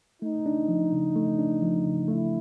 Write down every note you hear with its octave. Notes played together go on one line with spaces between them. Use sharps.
A3 D#4
D4
F3
C#3
A3
D4
F3
C#3
A3 E4